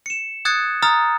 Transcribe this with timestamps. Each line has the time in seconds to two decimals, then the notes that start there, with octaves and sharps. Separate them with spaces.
0.06 C#7 E7
0.45 D#6 F#6 G#6 A6 C#7
0.83 A#5 D#6 F6 A6